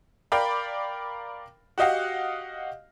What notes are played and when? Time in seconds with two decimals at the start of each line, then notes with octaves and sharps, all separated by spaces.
0.32 A#4 D5 F5 G5 B5
1.78 F#4 G4 D#5 F5 F#5